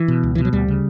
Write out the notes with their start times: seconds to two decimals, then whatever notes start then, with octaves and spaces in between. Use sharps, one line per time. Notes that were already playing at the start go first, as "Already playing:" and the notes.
Already playing: E3
0.08 B2
0.23 C#2
0.35 B2 E3
0.45 F#3
0.53 D2 G3
0.68 C#3